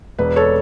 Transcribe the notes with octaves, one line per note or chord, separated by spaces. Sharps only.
E1 B4
A4 C#5